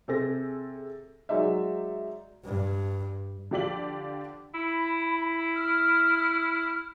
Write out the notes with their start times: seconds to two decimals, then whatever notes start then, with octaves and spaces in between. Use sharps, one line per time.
0.08 C3 G#4 A4 C5 A#6
1.29 F#3 G#3 D#4 D5 E5
2.45 G2
3.51 D3 F3 G4 D5 B6 F#7
4.55 E4 B5
5.55 F6